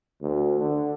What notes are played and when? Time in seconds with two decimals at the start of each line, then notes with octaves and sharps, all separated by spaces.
0.22 D2
0.60 D3